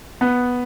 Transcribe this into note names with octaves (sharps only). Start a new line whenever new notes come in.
B3